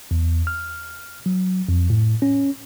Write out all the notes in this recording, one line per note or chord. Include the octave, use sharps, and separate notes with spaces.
E2
F6
F#3
F2
A2
C#4